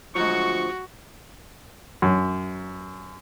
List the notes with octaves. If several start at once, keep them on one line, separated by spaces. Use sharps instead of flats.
D2 F3 F#3 G#3 F#4 C#6
F#2